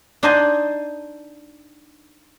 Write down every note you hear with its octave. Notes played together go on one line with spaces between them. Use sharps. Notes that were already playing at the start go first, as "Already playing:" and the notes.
D4 D#4 C5 D5 D#5 G#5